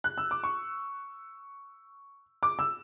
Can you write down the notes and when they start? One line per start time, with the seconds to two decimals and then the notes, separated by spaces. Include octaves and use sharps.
0.04 F#6
0.18 E6
0.31 D6
0.43 C#6
2.43 D6
2.59 E6